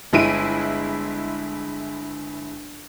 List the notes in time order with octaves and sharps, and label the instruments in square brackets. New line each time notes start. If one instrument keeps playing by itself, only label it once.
[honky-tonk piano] G1 G#3 E4 D7 D#7